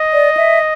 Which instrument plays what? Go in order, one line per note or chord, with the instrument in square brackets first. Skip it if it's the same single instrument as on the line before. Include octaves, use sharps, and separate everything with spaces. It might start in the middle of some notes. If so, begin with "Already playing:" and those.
Already playing: [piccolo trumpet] D#5
[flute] D5
E5